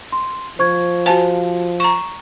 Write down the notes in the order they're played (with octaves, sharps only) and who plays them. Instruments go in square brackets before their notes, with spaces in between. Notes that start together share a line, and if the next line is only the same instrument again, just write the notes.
[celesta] C6
[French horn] F3 [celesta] C5 C#6 G#6
[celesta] F#4 F5 [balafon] C5 G#5 A5
[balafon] A#5 C#6 [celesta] E7